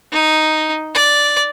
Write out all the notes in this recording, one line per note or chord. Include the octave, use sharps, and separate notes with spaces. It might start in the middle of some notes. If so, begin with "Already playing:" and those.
D#4
D5